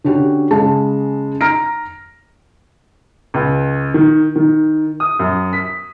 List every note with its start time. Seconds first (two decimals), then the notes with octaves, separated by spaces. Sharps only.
0.04 D3 C#4 F#4 G4
0.51 C#3 G#3 A5
1.41 A#5 F6 A#6 D7
3.34 C#2
3.94 D#3
4.36 D#3
5.00 D#6
5.19 F#2
5.53 B6